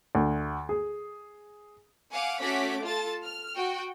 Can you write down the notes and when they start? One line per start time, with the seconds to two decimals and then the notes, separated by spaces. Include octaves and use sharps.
0.15 D2
0.69 G#4
2.12 F5 F#5 G#5 D6
2.41 A3 C#4 F#4 F#5 D6 B6
2.84 F4 A4 A5 A6
3.24 F6
3.56 F#4 G5